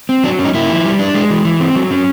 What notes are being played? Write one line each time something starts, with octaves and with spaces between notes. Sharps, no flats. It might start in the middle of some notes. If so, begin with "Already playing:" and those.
C4
F#3 D4
C#4
D#4
A#3 E4
F3
G3
D4
G#3
E3
E3
C4
F#3
C#4